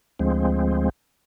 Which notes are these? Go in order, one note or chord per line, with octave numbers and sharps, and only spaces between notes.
D2 F3 G#3 C4